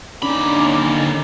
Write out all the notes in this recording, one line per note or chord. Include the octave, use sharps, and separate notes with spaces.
D#2 D3 C#4 D#4 B5 D6